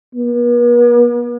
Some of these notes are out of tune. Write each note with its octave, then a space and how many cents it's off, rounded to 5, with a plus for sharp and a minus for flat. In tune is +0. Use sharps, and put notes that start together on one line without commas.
B3 -45